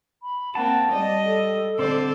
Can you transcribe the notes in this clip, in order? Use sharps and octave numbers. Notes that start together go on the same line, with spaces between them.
B5
A#3 C4 F#5 A5
G3 D5 D#5
A4
D3 C4 C5 D5